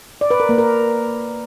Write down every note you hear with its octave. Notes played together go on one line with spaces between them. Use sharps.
D5
B4
A#4
A#3
A#4